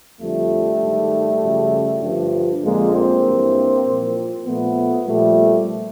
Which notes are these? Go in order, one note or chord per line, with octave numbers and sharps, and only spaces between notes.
F2 D3 F3 G3 A3
G#2 D#3
F#2 C#3 F3
G2 D3 F3
F2 D3 F3 G#3 A#3
A#3 C4
G2 E3
A#2 F3
A#2 F3 A3 B3
A#2 F3 G3 A3